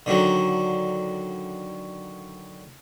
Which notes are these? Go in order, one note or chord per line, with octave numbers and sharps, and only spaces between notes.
D3 D#3 F#3